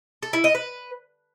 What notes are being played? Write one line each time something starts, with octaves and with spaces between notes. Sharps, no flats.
A4
E4
D#5
B4